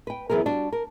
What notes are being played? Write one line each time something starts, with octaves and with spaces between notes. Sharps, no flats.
B4 G5
F#2 E3 B3 G#4 A#4
G3 D4 F#4
A#4